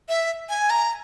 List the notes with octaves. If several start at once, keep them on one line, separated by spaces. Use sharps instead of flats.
E5
G#5
A#5